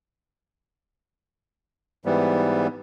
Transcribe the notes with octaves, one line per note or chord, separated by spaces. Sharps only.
G#2 E3 G3 B3